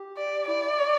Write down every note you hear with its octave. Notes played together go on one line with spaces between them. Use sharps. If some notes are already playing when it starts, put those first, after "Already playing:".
Already playing: G4
D5
E4 D5